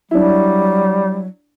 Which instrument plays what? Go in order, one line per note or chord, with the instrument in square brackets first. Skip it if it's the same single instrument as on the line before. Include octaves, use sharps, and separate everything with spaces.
[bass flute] F#3 [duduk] G3 [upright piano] D4 E4